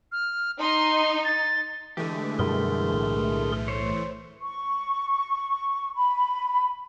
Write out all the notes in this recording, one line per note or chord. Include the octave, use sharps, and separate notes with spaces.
F6
D#4 C6
A6
D3 E3 G#3 A3 G4
F#2 B2 G3 G#4 A#4 C6
B1 A2
C5 C#5
C#6
B5